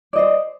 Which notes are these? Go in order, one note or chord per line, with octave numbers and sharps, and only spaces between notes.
C5 D5 D#5